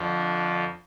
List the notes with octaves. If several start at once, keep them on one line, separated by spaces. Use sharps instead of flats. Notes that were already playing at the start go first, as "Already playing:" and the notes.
Already playing: F2 D3 F3
D4